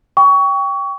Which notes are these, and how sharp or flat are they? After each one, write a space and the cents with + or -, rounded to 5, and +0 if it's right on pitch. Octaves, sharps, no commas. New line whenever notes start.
G5 +10 C#6 +25